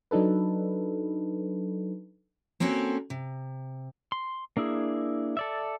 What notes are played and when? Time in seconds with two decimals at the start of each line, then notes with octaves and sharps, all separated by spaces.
0.11 F#3 D4 D#4 A4 B4
2.60 A#3 C4 C#4 F#4 A4
3.10 C3
4.12 C6
4.57 A#3 D4 E4 G#4
5.37 A4 D5 E5